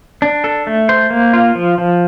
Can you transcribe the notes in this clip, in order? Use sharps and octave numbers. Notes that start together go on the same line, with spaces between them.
D4
A4
A3
C5
A#3
F4
F3
F3